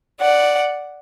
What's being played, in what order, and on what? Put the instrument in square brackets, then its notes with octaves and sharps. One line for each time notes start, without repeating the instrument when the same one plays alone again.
[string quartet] D5 F#5